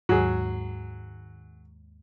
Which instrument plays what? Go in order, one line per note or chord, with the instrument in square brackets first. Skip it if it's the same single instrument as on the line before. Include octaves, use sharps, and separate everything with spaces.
[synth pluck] D#2 G#2 [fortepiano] F#3 G#4